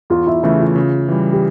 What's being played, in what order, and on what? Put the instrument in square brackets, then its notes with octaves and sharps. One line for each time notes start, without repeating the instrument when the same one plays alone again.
[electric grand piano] E2 [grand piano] F4
[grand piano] E4
[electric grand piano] C#3 E3 A3 [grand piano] E4
[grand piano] F4
[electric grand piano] C#3
E3 G3
[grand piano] G4